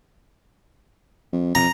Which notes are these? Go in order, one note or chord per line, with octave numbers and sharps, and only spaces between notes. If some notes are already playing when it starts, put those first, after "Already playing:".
F2
F2 A#5